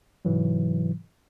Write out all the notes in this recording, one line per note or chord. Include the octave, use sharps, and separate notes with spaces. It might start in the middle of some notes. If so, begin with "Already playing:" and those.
G#2 C3 E3 F#3